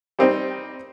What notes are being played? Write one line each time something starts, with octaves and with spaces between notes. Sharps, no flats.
G3 C4 D#4